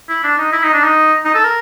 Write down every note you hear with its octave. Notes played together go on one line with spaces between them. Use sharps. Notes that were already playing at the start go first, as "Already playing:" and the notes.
E4
D4
D#4
E4
D#4
D4
D#4
D#4
A4
A#4